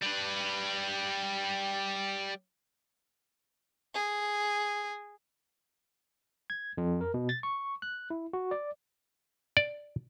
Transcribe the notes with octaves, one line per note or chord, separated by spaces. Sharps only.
G3 B4
G#4
G#6
F2
A#4
B2
A6
C#6
F#6
E4
F#4
D5
D5